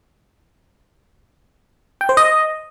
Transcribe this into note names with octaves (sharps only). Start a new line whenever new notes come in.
G5
C5
D#5